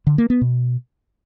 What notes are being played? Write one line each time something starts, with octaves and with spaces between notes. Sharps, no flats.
D3
A#3
B3
B2